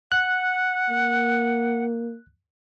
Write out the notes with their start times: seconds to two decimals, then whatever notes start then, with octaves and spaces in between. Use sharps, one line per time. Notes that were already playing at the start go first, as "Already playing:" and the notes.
0.12 F#5 F#6
0.89 A#3